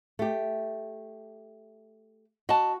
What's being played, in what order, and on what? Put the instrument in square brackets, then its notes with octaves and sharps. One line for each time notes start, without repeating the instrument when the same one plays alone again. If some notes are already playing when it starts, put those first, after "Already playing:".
[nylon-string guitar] A3 G4
[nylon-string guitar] F#4 [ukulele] D#5 A5